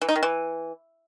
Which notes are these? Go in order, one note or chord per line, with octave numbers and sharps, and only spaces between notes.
E3
D#4
D#3
E3